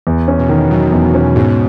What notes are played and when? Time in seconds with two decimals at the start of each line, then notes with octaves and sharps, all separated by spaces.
0.07 E2
0.28 C#4
0.39 B2
0.49 D#3
0.71 B2 F#3
0.92 E2
1.15 C#4
1.36 G#2 B2